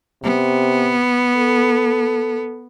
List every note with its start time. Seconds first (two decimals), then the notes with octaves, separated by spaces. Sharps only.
0.23 C3 B3
1.36 A4